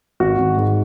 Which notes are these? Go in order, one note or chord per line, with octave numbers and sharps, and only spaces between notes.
G#1 F#4
G#1
G#2